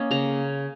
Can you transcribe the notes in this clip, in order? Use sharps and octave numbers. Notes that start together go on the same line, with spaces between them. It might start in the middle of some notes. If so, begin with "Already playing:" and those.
Already playing: A#3 C#4 D#5
C#3 A#5